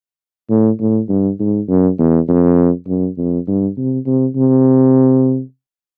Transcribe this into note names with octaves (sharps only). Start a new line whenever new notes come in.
A2
A2
G2
G#2
F#2
E2
F2
F#2
F2
G2
C3
C3
C3